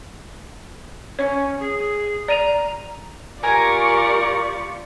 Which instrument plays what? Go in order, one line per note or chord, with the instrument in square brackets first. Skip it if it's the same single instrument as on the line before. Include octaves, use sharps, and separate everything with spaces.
[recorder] C#4 [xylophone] C#5
[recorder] G#4
[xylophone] D5 D#7 F7 [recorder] A#5
[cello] F4 G4 [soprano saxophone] A#4 [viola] D5 C#6 [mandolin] G#5 A#5